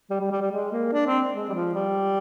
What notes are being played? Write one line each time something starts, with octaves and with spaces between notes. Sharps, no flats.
G3
G3
G3
G3
G#3
A#3
D4
C4
G#3
G3
F3
G3